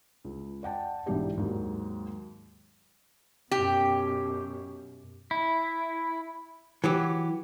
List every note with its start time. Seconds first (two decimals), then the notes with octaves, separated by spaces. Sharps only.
0.24 C#2
0.63 D5 F#5 G5 A5
1.06 B1 G#2 E3 D4 G4 D5
1.37 D#2 G#2 F#3
3.51 F#2 B2 G4
5.31 E4
6.84 E3 F#3 G4